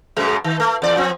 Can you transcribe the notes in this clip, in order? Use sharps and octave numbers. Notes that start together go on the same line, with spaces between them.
F#2 B2 G#3
D#3
A3
E2 D5
F3 C4